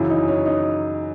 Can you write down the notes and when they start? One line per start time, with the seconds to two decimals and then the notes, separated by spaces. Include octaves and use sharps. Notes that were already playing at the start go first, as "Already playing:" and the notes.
Already playing: F#2 C#3 E3 E4
0.10 D#4
0.28 C#4
0.46 D#4